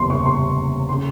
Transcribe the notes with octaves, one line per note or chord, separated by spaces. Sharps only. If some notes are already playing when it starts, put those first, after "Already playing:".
Already playing: F#1 E2 C3 C6
C#6
C6
C#3 C6